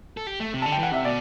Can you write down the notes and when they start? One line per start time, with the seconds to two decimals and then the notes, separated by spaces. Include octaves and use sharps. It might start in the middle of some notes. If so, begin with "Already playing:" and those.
0.17 A4
0.27 G4
0.40 A3
0.53 C3
0.62 D3 A5
0.72 G5
0.79 E3 F#5
0.92 C3 E5
1.04 B2 D5